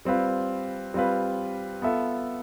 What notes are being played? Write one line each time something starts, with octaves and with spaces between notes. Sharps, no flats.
G3 C4 F4 B4
G3 C4 F4 B4
B3 F4 A4 E5